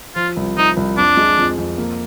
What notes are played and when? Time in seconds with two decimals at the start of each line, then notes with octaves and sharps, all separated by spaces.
0.16 F3 F4
0.37 C2
0.57 F3 D#4
0.77 C2
0.97 F2 D4
1.17 G#3
1.38 F2
1.58 F2
1.78 A#3